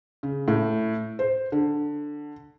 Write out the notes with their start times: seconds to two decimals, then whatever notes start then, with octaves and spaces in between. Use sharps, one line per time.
0.23 C#3
0.48 A2
1.19 C5
1.52 D3